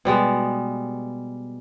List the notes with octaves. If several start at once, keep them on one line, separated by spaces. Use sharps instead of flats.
B2 G3 G#3 B3